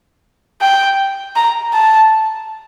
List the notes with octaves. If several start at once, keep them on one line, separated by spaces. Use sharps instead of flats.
G5
A#5
A5